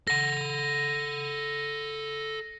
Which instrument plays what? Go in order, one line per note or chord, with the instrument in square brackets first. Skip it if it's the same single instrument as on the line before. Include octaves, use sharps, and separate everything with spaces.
[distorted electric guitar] A4 F#5 [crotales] A#6